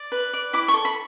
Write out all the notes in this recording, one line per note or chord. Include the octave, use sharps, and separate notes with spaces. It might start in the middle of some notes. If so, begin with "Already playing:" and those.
Already playing: D5
B4
D5
E4 D6
C#6
A4
B5